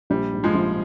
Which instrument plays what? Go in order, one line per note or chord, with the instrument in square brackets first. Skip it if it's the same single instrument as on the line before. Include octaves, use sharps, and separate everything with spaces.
[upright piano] A#1 [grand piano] G3
[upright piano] G#2
[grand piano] F3 G#3
[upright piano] A#1